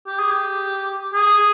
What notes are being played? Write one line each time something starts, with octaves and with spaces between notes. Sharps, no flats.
G4
G#4
G4
G#4